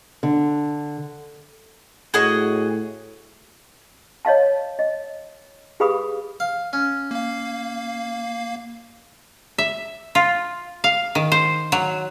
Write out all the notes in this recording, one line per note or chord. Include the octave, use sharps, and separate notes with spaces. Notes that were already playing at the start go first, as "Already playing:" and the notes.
D3
A2 F#4 G#4 D#5
C#5 D#5 F5 A5
D#5
G4 G#4 B4 F5 B5 D#6
F5
C#4
A#3 F5
E5
F4
F5
D#3
C5
F#3